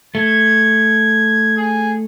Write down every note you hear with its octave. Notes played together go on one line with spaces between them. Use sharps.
A3 G#6
G#4